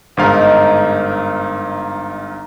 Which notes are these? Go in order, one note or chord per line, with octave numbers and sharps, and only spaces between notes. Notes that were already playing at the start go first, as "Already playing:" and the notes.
G1 G#2 D#4 A#4 F5 A5